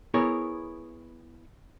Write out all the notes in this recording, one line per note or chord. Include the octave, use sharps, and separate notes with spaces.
B3 E4 G#4 A#4 C#5